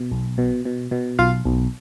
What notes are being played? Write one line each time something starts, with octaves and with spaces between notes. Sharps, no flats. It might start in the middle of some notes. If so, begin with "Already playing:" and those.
Already playing: B2
B1
B2
B2
B2
B1 F4 F5
B1